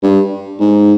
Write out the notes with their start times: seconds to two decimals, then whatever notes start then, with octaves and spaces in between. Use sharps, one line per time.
0.03 G2
0.60 G#2